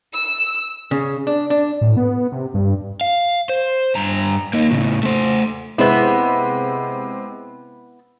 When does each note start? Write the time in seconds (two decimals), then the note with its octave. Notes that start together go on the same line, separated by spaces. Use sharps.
0.13 E6
0.91 C#3
1.27 D4
1.50 D4
1.81 A2
1.97 B3
2.32 C3
2.54 G2
3.01 F5
3.49 C5
3.95 G2 A#5
4.53 A#3 D#4
4.71 A2 C#3
5.03 A3 C5
5.78 C3 G#3 B3 E4 C5